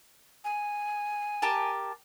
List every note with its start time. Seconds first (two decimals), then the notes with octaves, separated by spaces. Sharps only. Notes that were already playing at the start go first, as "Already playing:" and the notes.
0.45 G#5
1.42 G4 A#4 A5